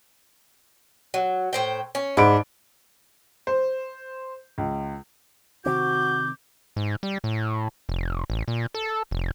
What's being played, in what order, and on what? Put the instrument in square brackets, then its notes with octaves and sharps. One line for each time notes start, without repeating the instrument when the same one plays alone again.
[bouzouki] F#3
A2 C5 G5
C#4
[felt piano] G#2 B5 D7 [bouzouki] D4
[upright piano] C5
C#2
[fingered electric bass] C3 D#3 C4 [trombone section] F#4 [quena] D6 [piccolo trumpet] G6
[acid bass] G#2
G3
A2
F1
A1
A#2
A4
F1